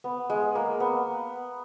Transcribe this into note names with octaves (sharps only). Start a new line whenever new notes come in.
B3
G#3
A#3
B3